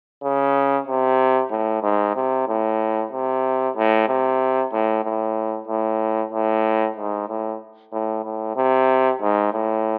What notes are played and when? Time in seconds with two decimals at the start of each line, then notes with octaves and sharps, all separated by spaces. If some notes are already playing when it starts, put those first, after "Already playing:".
0.23 C#3
0.87 C3
1.51 A2
1.83 G#2
2.15 C3
2.48 A2
3.12 C3
3.75 A2
4.08 C3
4.72 A2
5.04 A2
5.68 A2
6.32 A2
6.96 G#2
7.28 A2
7.92 A2
8.24 A2
8.56 C3
9.21 G#2
9.53 A2